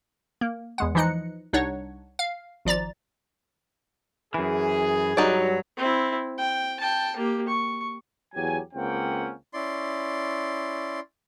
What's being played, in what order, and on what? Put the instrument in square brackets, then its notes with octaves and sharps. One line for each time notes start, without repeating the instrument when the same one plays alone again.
[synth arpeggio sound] A#3
E2 G#3 F#5
E3 F3 D#4 D#5 F#6 C#7
C2 D4 D#4 C#5 F#5
F5
G#1 F3 D5 A#5 A6
[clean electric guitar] F#2 E3 [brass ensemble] G#4
[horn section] G2 F#3 [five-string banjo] D#4 F#4 D5
[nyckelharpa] C4 E4
G5
G5 A5
A#3 G4
C#6
[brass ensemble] E2 F#3 G4 G#5
C#2 A#3 C4 C#4 F#5 G5
[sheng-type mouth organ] C#4 E4 D5 C6